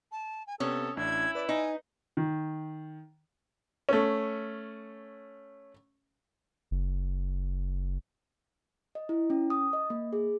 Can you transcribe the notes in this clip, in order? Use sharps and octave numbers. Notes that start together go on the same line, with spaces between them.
A5
G#5
C3 B3 C#4 A4 D#6
A1 D4 E4 G#6
B4 D5
D#4 G#5
D#3
A3 C#4
F#1
D#5
E4
C#4
D#6
D#5
A#3
G#4